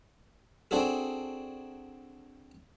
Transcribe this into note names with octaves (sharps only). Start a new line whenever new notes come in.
C4 D4 F#4 G#4 A4